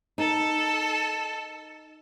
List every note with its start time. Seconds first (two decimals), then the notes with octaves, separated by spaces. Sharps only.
0.18 D#4 A4